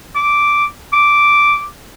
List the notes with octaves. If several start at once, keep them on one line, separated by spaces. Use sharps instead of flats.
D6
D6